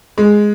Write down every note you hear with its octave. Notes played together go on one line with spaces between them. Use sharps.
G#3